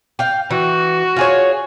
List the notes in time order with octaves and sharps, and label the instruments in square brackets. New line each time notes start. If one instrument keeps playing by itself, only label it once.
[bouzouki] F5 G5
[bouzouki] E3 [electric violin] F#4
[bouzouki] F4 G#4 C#5